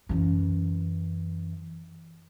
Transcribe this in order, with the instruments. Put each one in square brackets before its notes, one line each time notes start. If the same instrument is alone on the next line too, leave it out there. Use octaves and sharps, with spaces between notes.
[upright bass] F#2 E3